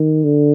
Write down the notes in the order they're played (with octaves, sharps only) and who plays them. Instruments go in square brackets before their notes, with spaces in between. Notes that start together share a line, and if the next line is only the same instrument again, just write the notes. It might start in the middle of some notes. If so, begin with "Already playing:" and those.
Already playing: [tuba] D#3
D3